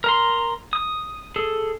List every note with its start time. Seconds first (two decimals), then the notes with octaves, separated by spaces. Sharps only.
0.04 A#4 A#5 C6
0.73 D#6
1.36 G#4 A4